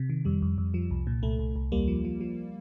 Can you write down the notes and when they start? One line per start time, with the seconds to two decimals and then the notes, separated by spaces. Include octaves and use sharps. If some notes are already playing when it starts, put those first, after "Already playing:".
Already playing: C3
0.10 D#3
0.25 F2 G3
0.42 F2
0.58 F2
0.74 F3
0.91 C2
1.07 A#2
1.23 C2 A3
1.39 C2
1.56 C2
1.72 D#2 G3 A#3
1.88 F3
2.05 F3
2.21 F3